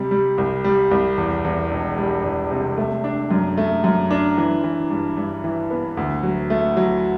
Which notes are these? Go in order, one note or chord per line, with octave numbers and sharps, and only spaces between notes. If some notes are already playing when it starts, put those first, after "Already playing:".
Already playing: C3 G3
G3
C2
G3
C2
E2
E2
E1
G3
E2
C3
A3
D4
F#2
A3
F#2
D4
E3
E3
G2
G2
E3
B3
D2
F#3
A3
F#3